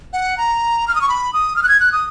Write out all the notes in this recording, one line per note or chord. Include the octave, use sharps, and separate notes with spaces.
F#5
A#5
F6
D#6
C#6
B5
D#6
F6
F#6
G#6
F#6
D#6